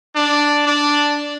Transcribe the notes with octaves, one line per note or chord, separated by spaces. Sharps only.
D4
D4